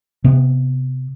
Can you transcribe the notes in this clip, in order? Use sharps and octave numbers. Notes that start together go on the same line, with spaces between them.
C3 B3